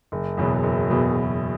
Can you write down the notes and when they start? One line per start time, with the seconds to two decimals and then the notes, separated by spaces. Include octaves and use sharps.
0.12 F#1
0.37 E2 B2 F#3
0.63 F#1
0.90 E2 B2 F#3
1.16 F#1